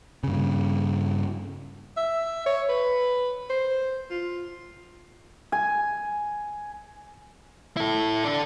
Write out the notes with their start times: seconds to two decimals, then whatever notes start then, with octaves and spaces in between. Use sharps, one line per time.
0.24 G2 C#3
1.97 E5
2.46 C#5
2.69 B4
3.50 C5
4.11 F4
5.52 G#5
7.77 E4 A4
8.25 D4 A4